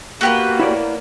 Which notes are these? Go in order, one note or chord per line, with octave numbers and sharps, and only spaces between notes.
A#3 B3 F#4 G4 B4
E4 C#5 D5